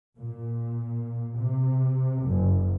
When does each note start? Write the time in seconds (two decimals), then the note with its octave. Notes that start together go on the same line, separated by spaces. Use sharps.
0.18 A#2
1.37 C3
2.24 F#1